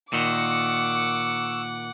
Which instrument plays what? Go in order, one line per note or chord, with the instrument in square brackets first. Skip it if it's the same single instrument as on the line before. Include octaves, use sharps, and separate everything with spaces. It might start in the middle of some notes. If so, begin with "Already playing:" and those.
[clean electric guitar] A#2 D#3 [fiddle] F#5 [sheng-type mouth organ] C#6 E6 [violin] D6